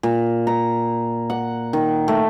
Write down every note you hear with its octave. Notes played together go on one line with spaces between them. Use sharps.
A#2
A#5
F#5
D#3
A3